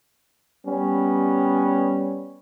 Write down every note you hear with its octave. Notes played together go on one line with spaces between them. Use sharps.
G3 B3 C#4